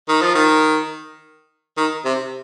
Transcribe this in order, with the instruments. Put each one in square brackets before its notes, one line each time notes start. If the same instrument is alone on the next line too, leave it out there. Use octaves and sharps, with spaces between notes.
[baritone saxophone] D#3
F3
D#3
D#3
C3